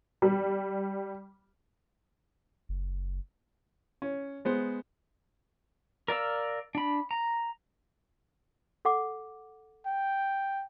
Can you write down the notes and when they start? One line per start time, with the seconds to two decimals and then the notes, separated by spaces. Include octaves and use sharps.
0.22 G3
2.69 F#1
4.02 C#4
4.45 G#3 B3 C5
6.08 A#4 D5 F5 E6
6.75 D4 B5
7.11 A#5
8.85 A4 F#5 D6
9.86 G5